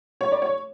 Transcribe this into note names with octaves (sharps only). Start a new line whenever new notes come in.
C#5
D5
C#5